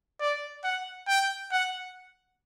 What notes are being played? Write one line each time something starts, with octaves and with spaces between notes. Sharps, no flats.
D5
F#5
G5
F#5